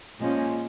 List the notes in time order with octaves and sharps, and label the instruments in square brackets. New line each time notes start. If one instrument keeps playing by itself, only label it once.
[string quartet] A#2 F3 G#3 C#4